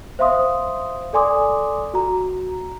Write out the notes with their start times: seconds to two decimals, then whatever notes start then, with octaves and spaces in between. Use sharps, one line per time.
0.19 C5 E5 F5 C6 D#6
1.13 A4 D5 G#5 C6 D6 D#6
1.94 F#4 A#5